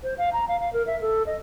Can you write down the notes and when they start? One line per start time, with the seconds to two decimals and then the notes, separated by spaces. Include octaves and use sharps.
0.03 C5
0.18 F5
0.33 A#5
0.48 F5
0.60 F5
0.73 A#4
0.87 E5
1.01 A4
1.26 D#5